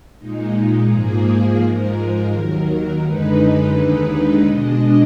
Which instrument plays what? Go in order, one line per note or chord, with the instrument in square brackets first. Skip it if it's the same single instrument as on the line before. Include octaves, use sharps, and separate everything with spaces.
[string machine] A#2 G#3 D#4
G#2 F3 A#3 G#4
G#2 F3 G#3 A#4
D#2 D#3 F#3 A#4
F#2 D3 G#3 D#4 B4
D#2 D3 G#3 D#4 B4
B2 G#3 D4 D#5